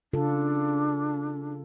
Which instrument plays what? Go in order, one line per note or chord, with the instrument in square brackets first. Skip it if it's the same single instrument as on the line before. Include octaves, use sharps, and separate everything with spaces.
[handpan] C#3 F4 A4 [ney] D4